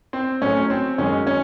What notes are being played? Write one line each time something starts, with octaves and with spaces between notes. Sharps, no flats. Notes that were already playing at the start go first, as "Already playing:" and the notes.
C4
A2 F#3 C#4
C4
F#2 D#3 G#3 C#4
C#4